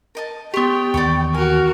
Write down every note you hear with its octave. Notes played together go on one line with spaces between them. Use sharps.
A#4 D#5 A5
B3 G4 C#5 G5 C6 C#6
D#2 E3 D5 B5 C#6
F#4 A#4 G#5